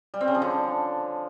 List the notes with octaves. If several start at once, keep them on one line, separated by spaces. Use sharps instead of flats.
G3
C4
C#3
F3
D3